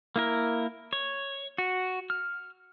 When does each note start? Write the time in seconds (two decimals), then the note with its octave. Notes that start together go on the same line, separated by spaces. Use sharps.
0.16 A#3 E4 A#4
0.93 C#5
1.58 F#4
2.10 F6